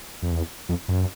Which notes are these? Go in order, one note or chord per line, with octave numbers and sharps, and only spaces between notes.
F2
E2
F2
F#2